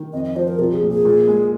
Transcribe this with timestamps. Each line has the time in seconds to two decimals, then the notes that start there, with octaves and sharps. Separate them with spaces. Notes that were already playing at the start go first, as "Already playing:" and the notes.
Already playing: D#3
0.13 F2 D#5
0.24 D#5
0.36 F3 C5
0.48 A#4
0.59 C2 F4
0.74 G#4
0.83 A#2
0.90 G#4
1.05 A#2
1.28 G#3